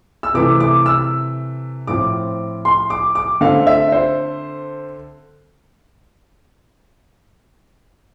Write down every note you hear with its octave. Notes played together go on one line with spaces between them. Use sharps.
E6
C3 E3 A3 D6
D6
E6
A2 F3 C4 D6
C6
D6
D6
D3 A3 C4 F5
E5
C5